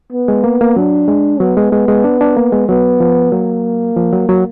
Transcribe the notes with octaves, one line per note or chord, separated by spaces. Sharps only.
B3
G#3
A#3
A#3
F#3 D4
G#3
F#3 B3
G#3
G#3
G#3
D4
D4
A#3
G#3
F#3 B3
F3
F#3 A#3
F3
F#3
F#3